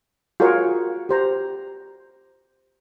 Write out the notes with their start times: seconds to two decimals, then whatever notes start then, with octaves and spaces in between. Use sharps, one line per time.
0.40 F4 F#4 G#4 A#4 C#5 F5
1.09 G4 C5 A#5